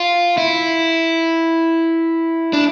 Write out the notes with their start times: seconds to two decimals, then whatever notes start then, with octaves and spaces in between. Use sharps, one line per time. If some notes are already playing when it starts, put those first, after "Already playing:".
Already playing: F4
0.38 E4
2.53 D4